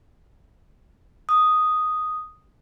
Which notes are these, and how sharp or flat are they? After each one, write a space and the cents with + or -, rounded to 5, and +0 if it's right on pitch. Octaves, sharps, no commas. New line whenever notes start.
D#6 +0